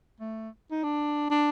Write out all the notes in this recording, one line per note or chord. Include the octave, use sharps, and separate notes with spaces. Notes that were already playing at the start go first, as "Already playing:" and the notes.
A3
D#4
D4
D4